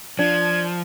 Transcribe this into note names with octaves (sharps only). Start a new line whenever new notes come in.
F3 D4 G#6